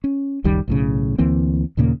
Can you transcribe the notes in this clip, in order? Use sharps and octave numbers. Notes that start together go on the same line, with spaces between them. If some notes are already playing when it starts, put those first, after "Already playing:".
C#4
F#1 C#2 D#3 G3
B1 A2 C#3
D2 E3 A#3 C4
D#2 A#2 C#3 A#3